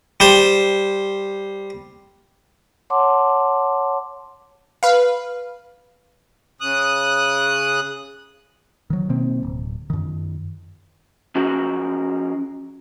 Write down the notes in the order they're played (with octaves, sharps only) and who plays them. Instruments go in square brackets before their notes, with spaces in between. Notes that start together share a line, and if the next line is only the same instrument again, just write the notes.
[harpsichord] G3 C5
[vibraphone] C#5 F#5 A5 C6 D6
[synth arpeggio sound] B4 F5
[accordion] C#3 D#6 F#6
[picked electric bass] D#3 F#3
B2 D#3 A#3 C4
D1
F#2 D#3
[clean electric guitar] F3 C#4 F#4 G#4 A#4